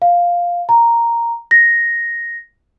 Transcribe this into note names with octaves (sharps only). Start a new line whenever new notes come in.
F5
A#5
A#6